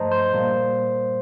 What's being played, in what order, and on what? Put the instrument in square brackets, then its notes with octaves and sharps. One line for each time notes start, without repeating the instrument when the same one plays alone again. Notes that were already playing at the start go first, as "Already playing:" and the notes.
Already playing: [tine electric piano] G2 F3 A3 C5 D#5 A5 A#5
C5
A#2 G3 A#3